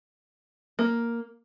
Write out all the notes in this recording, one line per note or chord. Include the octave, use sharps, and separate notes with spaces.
A#3